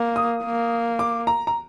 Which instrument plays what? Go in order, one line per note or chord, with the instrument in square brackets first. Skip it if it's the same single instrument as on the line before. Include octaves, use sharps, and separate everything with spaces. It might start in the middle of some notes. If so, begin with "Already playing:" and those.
Already playing: [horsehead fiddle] A#3
[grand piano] D#6
[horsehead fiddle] A#3
[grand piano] D6
A#5
A#5